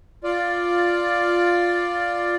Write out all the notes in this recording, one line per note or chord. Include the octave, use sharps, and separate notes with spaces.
F4 D5